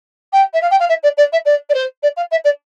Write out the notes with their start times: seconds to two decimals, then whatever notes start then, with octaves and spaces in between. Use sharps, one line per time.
0.32 G5
0.53 E5
0.62 F5
0.71 G5
0.80 F5
0.89 E5
1.03 D5
1.17 D5
1.32 E5
1.45 D5
1.69 D5
1.74 C5
2.02 D5
2.16 F5
2.31 E5
2.44 D5